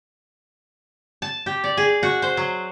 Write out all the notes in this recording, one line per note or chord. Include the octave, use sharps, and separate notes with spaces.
A5
G4
D5
G#4
F#4
C5
F#3